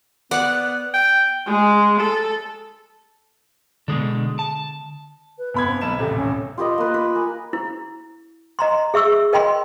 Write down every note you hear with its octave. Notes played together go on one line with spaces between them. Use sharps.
B3 D5 F#5
G5
G#3
A4
B2 D3 G#3 D4
A5
B4
G1 B3 B5 G#6
C4
B1 A5 B5 E7
D#1 A1 C3 A4
C#4
F4 G4 B4 D#5
A#3 B4
B4 B5 D6
A#4 G#5
E4
D#5 A#5 C6
G#4 E5 C#6 E6
A#4 D#5 G5 B5 C6